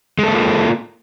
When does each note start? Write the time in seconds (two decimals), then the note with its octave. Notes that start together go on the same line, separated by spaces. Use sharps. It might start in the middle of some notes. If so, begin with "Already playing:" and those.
0.19 G#3
0.23 A4
0.28 A#3
0.33 F4